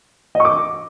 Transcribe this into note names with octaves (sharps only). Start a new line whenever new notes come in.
D#5 C#6 D6